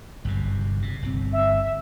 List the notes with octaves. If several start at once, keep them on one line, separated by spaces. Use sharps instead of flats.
G1 F#2 C3
C3
G1 B2 C4
E5